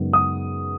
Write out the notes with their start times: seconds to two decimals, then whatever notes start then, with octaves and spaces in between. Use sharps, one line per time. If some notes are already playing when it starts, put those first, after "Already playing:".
Already playing: F#2 C#3 G#3 B3 D#4
0.13 D#6